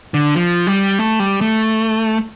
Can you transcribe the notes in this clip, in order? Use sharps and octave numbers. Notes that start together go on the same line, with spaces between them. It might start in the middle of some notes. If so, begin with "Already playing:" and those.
D3
F3
G3
A3
G3
A3